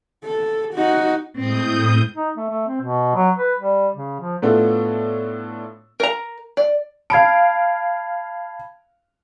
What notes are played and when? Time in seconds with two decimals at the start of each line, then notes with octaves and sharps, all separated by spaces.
0.24 A4
0.74 D#4 F#4
1.37 A2 G#3 C4 D#6 G6
2.16 D#4
2.37 A3
2.50 A3
2.67 C4
2.82 B2
3.15 F#3
3.38 B4
3.59 G3
3.95 C#3
4.20 F3
4.42 A2 A3 B3 D4 F4 A4
6.00 A#4 A#5
6.57 D5
7.10 F5 A5 B5 G#6 D7